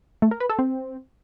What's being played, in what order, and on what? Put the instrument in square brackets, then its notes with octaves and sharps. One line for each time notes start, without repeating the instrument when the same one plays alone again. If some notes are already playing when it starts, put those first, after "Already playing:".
[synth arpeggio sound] A3
A#4
B4
A4
C4